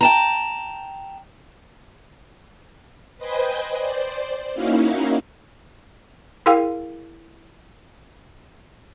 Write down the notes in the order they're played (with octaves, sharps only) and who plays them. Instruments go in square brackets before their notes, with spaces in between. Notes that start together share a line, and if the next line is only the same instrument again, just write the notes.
[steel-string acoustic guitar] G5 A5 A#5
[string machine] B4 C5 D#5 G5 G#5 B5
C5 D5
A#3 C#4 D#4 E4 F#4 F5
[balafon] E4 G#4 A#4 F5 G5